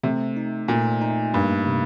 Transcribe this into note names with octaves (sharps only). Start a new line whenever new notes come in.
C3 A3
D#4
A#2 A3
D#4
G2 A#3
C3